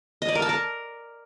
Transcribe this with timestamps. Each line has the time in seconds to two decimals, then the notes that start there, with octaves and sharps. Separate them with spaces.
0.22 D#5
0.29 D5
0.35 A#4
0.42 A5
0.49 A#4